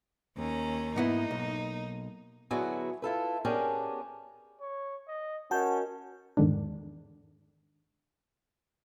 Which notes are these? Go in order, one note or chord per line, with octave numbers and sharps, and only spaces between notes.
D#2 C#4 A#5
G#2 A#3 B3 D#4 E4
B1
D3 F#3 B3 E4 F#4 G#4
E4 F4 A4 B4
B3 C#4 D4 G4 G#4 A#4
C#5
D#5
C#4 F#4 A#4 D#5 F#5 A5 G6
E2 G#2 D3 D#3 G#3 D4